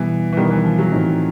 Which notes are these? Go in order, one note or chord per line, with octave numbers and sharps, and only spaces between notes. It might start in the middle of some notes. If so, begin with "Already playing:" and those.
Already playing: B2 E3 G3 B3
E3
B2 D#3 G3 B3
E3
F3
F#3
A2 E3 A3 C4 D#4